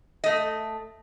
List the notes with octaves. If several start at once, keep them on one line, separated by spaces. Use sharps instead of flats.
A3 D#5